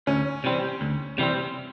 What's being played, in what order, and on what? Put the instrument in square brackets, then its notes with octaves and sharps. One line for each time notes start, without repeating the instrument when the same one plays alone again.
[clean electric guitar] D2 [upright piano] C#4
[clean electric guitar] C3 E3 G3 C4
D2
C3 E3 G3 C4